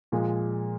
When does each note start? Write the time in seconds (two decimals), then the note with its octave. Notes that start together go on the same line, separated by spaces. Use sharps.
0.12 A#2 F3 G#3